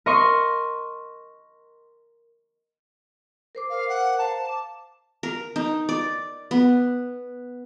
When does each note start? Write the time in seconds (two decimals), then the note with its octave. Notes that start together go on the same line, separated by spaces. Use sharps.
0.06 A#4 D#5 C6 C#6
3.55 A#4 C5 D6
3.70 F5
3.89 F#5
4.19 C5 F5 A5 A#5
4.49 D6
5.23 A#4
5.56 D#4
5.89 D5
6.51 B3